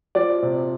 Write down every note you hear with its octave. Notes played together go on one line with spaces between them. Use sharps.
F3 D5
C3